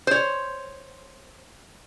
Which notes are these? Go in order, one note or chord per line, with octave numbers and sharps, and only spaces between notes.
C5 C#5